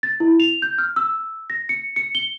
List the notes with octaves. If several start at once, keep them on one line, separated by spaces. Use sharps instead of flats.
A6
E4
F7
G6
F6
E6
A#6
C#7
C#7
G7